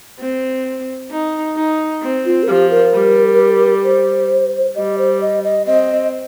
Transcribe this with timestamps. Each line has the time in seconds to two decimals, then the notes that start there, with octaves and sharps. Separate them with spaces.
0.20 C4
1.11 D#4
1.57 D#4
2.03 C4
2.26 F4
2.43 A#4
2.48 F3 G4
2.71 A#4
2.93 G3
3.84 C5
4.75 G3 D#5
4.98 C5
5.21 D#5
5.44 D#5
5.67 C4 D#5